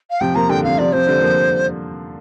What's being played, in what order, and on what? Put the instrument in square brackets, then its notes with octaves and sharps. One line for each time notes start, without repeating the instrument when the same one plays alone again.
[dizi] F5
[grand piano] C3 F3 [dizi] G5
[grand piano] F3 A#3 [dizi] A#5
[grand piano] D3 G3 [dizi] G5
[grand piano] C3 F3 [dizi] F5
[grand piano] C3 F3 [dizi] D5
[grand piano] C3 F3 [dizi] C5
[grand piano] D3 G3
F3 A#3